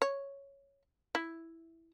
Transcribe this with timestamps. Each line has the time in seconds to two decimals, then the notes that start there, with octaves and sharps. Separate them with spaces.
0.02 C#5
1.15 E4